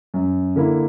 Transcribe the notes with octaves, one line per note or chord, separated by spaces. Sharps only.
F#2
D3 A#3 E4